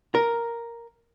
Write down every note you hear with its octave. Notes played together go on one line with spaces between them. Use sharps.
A#4